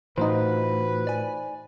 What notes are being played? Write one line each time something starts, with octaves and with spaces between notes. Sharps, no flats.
A2 E3 D#4 F4 F#4 B4 C5
D5 G#5